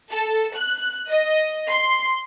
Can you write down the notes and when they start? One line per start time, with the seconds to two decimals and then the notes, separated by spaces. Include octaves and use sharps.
0.11 A4
0.56 F#6
1.10 D#5
1.69 C6